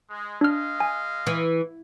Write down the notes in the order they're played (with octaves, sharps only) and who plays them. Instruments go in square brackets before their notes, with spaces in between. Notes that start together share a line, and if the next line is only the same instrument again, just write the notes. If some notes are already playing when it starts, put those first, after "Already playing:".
[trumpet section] G#3
[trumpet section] G#3 D#5 F5 [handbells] D4 F6
[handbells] G#5
[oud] E3